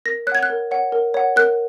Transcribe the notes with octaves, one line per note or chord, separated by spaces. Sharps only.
A#4 A#6
C#5 F#5 F#6 G#6
F#6
A#4
C#5 F#5
A#4
C#5 F#5
A#4 F#6